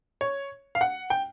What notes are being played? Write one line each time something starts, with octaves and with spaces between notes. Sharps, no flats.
C#5
F5
F#5
G5